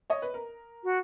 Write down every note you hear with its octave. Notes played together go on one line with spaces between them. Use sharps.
C#5 D#5
B4
A#4
F#4